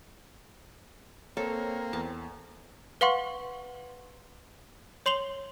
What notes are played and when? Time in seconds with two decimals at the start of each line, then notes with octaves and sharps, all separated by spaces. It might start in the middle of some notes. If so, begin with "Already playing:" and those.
1.37 A#3 C4 A4 C#5
1.93 E2 A5
3.01 B4 F5 F#5 C6 C#6
5.06 C#5 C6 C7 F7 G7